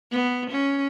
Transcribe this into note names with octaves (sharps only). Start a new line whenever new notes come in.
B3
C#4